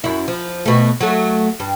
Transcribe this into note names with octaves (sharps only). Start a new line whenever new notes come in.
F#2 E4
F3
B2 A3
F#3 A3
G2